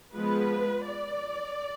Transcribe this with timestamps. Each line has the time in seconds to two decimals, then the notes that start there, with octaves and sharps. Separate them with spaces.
0.14 F3 G#3 B3 B4
0.87 D5